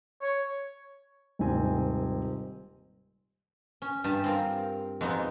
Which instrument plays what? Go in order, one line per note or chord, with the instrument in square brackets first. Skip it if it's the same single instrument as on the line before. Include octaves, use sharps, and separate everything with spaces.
[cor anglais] C#5
[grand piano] D#1 D#2 G#2 C3 C4 G#5
[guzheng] C#4
G2 G4 A5
C4 F4 A#4
F2 G#3 B3 D#4